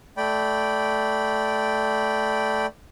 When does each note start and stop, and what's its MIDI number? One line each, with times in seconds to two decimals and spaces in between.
0.17 2.66 57
0.17 2.66 74
0.17 2.66 79
0.17 2.66 83